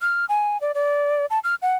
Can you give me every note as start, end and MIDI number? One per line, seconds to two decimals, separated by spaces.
0.01 0.25 89
0.29 0.57 80
0.61 0.72 74
0.75 1.26 74
1.30 1.39 81
1.44 1.55 89
1.62 1.76 78